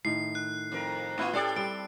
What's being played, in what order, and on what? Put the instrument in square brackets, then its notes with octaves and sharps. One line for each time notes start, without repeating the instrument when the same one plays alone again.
[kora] A2 D#3 [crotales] C7
[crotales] F#6
[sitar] F2 A#4
[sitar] A#3 F4 [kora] C#4 E4 B4
[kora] C#4 [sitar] G4 A4 D5 [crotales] C7
[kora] G3 C4 [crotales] D7